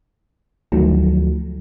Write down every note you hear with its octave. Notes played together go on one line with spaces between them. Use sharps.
D2 D#3 F3 F#3 A3